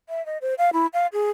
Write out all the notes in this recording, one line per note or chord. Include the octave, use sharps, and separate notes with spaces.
E5
D#5
C5
F5
E4
F5
G#4